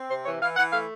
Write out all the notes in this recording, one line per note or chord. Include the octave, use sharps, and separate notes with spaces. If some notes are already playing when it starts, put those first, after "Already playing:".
Already playing: C4
C3 C5
E3 C#5
E3 F5
E3 F#5
A3 F5